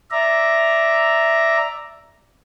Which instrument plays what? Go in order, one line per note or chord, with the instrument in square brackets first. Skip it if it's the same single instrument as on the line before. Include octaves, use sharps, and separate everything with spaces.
[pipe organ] D5 E5 A#5